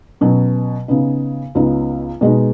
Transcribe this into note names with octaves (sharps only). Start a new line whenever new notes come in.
B2 F#3 C#4
C#3 B3 D#4
C#2 C#3 B3 D#4
B2 G#3 D#4